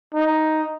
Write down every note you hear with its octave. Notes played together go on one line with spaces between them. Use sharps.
D#4